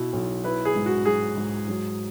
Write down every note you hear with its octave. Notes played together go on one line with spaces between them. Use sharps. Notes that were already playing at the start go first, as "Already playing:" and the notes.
Already playing: B2 E4
B1
E4 B4
G#4
G#2
F#4
F#3 G#4
G#2
F#3